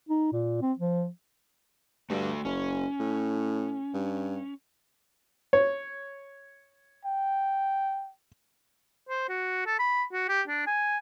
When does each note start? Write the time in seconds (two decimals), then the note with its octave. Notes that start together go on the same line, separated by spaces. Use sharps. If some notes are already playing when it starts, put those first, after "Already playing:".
0.09 D#4
0.32 A#2
0.61 C4
0.79 F3
2.10 G2 A3 F#4 A4
2.45 F#1 C#4
3.00 A2
3.94 G2
5.53 C#5
7.05 G5
9.09 C5
9.29 F#4
9.66 A4
9.79 B5
10.12 F#4
10.28 G4
10.48 D4
10.67 G#5